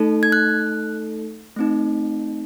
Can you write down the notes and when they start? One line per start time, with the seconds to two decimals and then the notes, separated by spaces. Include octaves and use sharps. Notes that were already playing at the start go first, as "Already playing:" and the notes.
Already playing: A3 D#4 A4
0.23 G#6
0.32 F#6
1.56 A3 C4 D#4